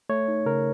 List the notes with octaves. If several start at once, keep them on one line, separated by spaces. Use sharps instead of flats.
A3 C#5
D#4
C#3 A#4